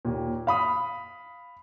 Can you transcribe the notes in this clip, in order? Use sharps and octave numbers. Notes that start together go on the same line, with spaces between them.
D#2 A#2
F5 B5 D#6